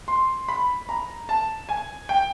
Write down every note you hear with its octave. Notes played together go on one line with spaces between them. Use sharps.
C6
B5
A#5
A5
G#5
G5